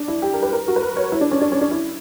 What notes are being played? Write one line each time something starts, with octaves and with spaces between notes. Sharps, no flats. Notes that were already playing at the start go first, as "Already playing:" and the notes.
Already playing: D4
E4
G4
A#4
B4
A#4
F#4
B4
A#4
C#5
E4
D4
C#4
D4
C#4
D4
E4